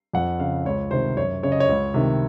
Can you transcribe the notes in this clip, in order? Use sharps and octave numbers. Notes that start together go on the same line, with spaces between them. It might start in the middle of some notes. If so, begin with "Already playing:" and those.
F2 F#5
C#3 F5
C#2 C#5
C3 D#3 C5
F#2 C#5
C#3 C#5
D#5
C#5
C#2
C3 D#3